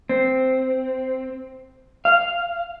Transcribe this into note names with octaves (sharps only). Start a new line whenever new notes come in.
C4
F5